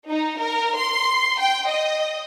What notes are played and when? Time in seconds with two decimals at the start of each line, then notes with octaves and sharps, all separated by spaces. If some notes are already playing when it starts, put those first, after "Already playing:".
0.10 D#4
0.42 A#4
0.78 C6
1.40 G5
1.70 D#5